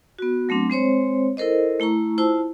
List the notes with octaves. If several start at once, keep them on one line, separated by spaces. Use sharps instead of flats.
B3 F#4
F#3 A3 C4 D4
G#3 C4 C5 C#5
E4 A4 A#4 C5 D#5
A3 E4 A#5 C#6
E4 F4 C5 A5 E6